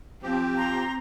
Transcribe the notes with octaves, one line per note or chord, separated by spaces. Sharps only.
F3 C4 G4
A#5 C6 G6